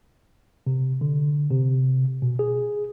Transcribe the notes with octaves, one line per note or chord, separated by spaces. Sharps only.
C3
D3
C3
B2
G#4